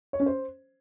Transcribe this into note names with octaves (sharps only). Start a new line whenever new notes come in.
C#5
C#4
C5